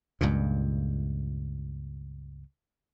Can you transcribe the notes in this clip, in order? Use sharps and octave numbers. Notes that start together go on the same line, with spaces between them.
C#2 G2 A#2